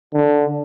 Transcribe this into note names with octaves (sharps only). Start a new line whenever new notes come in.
D3